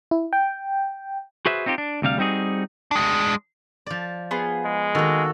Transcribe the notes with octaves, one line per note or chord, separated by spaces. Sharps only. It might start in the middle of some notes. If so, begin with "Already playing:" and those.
E4
G5
F#4 G#4 B4 C5 E5
C4 D#4 F4 G4
D4
D2 C3 G3 F5
G3 C4 D#4 F#4 G#4
G#3 D4
F3 D5
B3 F4 G#4
G#3
D#3 A#3 F#4 A4